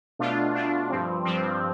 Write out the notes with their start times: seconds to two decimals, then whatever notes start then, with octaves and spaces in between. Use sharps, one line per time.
0.19 B2 A3 D4 F4
0.55 B2 A3 D4 F4
0.90 G2 F3 C4
1.25 G2 F3 C4